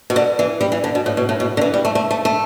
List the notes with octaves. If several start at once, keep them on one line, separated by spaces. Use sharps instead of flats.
B2
D3
E3
G3
E3
D3
B2
A2
B2
A2
B2
D3
E3
G3
A3
A3
A3
A3